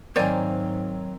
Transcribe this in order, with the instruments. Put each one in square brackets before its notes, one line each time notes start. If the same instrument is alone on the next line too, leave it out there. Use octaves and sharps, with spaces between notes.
[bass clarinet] G#2 [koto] D#3 A#3 C4 [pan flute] F#3 [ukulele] C5 D5 G#5